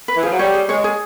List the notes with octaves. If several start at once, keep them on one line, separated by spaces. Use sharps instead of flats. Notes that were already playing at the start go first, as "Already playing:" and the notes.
B4
E3
F3 G#4
F#3
G3 C#5
G#4
G#3 C#5
G#4